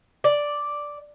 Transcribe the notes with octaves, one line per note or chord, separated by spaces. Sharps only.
D5